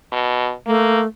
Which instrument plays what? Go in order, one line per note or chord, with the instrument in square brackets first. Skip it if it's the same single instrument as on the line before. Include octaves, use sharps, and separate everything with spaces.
[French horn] B2
[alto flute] A3 [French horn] A#3